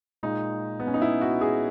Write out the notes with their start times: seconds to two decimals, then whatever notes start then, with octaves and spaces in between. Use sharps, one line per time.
0.23 A#2 G#3 D#4
0.80 B3
0.87 C#4
0.94 D#4
1.02 E4
1.21 F#4
1.41 G#4